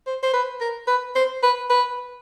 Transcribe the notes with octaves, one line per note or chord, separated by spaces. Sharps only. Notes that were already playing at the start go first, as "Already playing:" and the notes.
C5
C5
B4
A#4
B4
C5
B4
B4